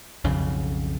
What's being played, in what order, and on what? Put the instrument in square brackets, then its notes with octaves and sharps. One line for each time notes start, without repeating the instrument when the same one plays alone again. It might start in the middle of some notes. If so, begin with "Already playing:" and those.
[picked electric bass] B1 F2 C#3